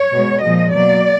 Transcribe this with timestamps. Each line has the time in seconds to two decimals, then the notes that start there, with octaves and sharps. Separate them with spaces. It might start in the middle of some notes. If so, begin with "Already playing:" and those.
Already playing: C#5
0.13 B2 G#3
0.42 A#2 F3 G#3 D#5
0.71 B2 F#3 A#3 D5